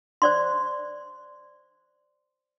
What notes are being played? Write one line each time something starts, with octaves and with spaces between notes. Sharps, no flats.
C5 D5 C6